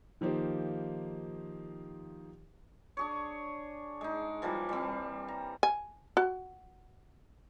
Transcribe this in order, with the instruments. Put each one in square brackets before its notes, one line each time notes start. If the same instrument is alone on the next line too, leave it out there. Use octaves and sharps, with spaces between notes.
[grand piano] D#3 F3 A#3 D#4 G4 C5
[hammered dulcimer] D4 G#4 C#5
G#3 D#4
E3 F3 G3 A#3
G3 C4
A#5
[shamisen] G#5
F#4